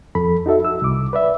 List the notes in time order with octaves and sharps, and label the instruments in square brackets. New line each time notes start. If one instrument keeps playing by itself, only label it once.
[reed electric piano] F2 A4 B5
D#4 F#4 A4 E5
E6
C2 D6
B4 D5 E5